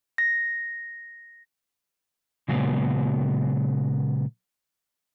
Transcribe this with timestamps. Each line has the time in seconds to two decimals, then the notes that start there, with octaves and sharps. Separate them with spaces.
0.18 A#6
2.48 A#2 C#3 F#3 G#3 A#3 B3